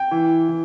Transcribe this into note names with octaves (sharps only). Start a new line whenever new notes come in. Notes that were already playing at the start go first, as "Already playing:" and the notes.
Already playing: G5
E3
E3